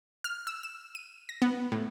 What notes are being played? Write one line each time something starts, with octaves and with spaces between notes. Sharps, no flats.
F6
E6
E7
D#7
A#6
B3
A2